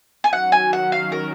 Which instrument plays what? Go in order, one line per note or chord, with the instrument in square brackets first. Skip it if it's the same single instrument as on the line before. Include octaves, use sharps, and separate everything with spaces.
[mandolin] G#5
[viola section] D#3 F#3 C#4 F#4 [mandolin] F#5
[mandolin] G#5
F#5
F5
A#4